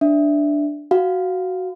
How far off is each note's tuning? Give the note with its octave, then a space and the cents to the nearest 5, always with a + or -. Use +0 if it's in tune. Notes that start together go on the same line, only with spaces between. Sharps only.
D4 +0 E5 +0
F#4 +5 F5 +0